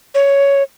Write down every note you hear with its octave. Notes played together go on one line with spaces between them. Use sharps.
C#5